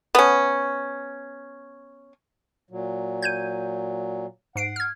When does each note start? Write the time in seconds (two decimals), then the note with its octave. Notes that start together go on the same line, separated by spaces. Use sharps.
0.15 B3 C#4
2.70 A#2 F#3
3.22 G6 G#6 D#7
4.56 G#2 F#5 C7 D7
4.76 F6 G#6